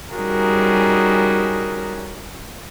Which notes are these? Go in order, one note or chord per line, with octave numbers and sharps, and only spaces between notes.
G3 C#4 D#4 F#4 G#4 A#4